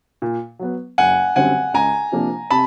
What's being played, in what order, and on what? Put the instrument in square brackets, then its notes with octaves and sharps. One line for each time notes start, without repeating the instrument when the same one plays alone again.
[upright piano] A#2
F#3 B3
[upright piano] F#1 [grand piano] F#5 G#5
[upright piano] F#2 D3 G3 C4 [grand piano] F#5 G#5
[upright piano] C#2 [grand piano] G#5 A#5
[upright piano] C3 F3 A#3 D4
[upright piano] C3 [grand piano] A5 B5